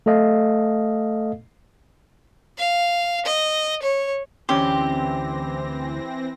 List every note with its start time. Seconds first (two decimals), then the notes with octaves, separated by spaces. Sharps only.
0.06 A3 A4 D#5 F5
2.58 F5
3.25 D#5
3.82 C#5
4.49 D2 E3 C4 C#4 G4 C6 A#6